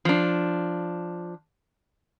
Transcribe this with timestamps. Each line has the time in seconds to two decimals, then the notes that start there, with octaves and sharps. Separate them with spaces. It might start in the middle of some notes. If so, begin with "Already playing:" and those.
0.05 F3 D4